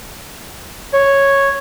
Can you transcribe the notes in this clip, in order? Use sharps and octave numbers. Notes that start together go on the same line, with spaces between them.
C#5